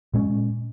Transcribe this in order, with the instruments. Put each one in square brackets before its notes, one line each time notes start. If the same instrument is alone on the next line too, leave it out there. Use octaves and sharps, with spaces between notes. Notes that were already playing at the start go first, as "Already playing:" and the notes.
[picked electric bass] A#2 G#3 C#4